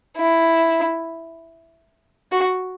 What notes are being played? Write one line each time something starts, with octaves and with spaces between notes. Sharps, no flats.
E4
F#4